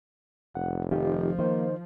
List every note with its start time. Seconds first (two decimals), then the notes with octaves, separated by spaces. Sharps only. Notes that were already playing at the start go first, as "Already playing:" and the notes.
0.55 F1 F#5
0.92 D#3 F3 F4 G4
1.39 D#3 A#3 C5